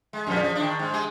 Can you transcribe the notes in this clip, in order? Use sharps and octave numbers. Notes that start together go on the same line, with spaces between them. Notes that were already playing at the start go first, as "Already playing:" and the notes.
G#3
F2 A#2 F3
F3
D#3 D4
G#2
G#3 G#4